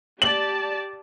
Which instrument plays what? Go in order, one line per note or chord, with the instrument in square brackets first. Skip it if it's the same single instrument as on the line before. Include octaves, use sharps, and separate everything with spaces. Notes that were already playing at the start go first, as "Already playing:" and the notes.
[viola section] G4 D5 A5 [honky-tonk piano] F#7